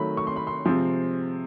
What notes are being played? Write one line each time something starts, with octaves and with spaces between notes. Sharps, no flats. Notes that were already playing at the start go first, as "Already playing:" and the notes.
Already playing: D#3 F#3 A3 B5
C#6
C6
B5
C6
C3 F3 G#3 C4 C6